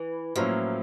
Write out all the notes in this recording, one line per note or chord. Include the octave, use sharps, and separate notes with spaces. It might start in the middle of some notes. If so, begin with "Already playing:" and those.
Already playing: E3
A2 F3 F#3 A#3 C#4 E4